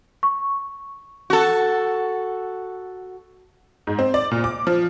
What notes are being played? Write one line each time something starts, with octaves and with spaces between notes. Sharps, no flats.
C#6
F#4 A4
G#2
C4
D5
A#2
D6
F3